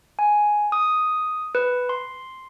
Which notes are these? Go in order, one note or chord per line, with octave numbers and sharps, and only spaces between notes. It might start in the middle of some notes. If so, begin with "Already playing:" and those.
G#5
D#6
B4
C6